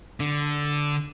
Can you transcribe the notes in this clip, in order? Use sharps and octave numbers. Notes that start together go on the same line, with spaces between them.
D3